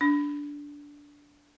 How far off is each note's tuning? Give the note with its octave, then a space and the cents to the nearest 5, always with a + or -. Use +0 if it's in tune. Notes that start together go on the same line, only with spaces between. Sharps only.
D4 -15